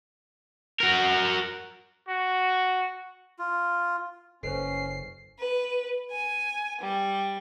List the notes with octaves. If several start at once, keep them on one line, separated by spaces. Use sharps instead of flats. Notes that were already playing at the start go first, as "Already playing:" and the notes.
F#4 A#4
F#4
F4
F#1 C#4 A4 B4 C5 C7
B4
G#5
G3